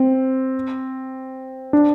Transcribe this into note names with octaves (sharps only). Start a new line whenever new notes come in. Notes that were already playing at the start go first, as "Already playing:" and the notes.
Already playing: C4
D4